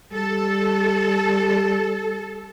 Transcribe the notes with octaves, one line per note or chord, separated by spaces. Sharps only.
G3 A4